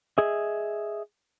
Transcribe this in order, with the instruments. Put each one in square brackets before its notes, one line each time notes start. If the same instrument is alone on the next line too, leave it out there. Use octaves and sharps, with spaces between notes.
[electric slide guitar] G#4 D#5 E5